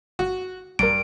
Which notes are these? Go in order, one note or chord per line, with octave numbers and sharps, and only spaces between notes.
G1 F#4
A#1 G2 A#4 D7